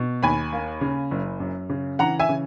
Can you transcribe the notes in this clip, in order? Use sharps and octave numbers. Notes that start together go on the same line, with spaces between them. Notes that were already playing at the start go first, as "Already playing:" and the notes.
Already playing: B2
D#2 G#5 B5
A#3
C#3
F#1
F#2
C#3
E3 F#5 A#5
E5 G#5
C#3